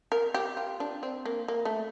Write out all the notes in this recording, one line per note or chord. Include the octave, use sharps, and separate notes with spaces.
A#4
G4
F4
D4
C4
A#3
A#3
A3